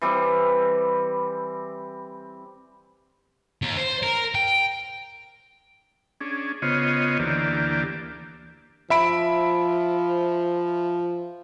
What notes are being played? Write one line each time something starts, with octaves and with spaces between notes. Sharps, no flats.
E3 G3 C4 G4
D#2
C5
A#4
G5
C#4 D4 G#4
C#3 B3 F4 C5 C#5 D#5
D2 E3 A#3 G4 D5
F3 E5 B5 D7